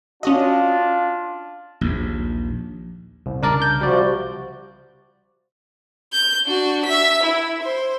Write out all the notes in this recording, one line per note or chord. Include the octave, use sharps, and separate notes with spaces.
C#4 D4 F4 F#4 D#5
A#1 D#2
C2
C2 C#3 D4 A#4 D5
G6
C3 F3 G3 F#4 D5
G6
D4 F#4
E5 B6
E4
C5